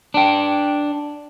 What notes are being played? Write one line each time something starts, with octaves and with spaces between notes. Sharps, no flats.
D4 G5